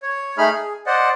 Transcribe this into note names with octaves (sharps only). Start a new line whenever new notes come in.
C#5
A3 D#4 G#4 B5 F6
G#4
C5 D5 D#5 F#5